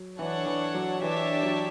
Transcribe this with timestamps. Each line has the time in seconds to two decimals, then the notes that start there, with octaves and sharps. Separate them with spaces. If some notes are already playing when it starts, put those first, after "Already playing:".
Already playing: F#3
0.19 E3 D4 A4 C#5 F#5
0.46 E3
0.75 F#3
1.02 E3 D4 G4 C#5 E5 A5
1.43 F#3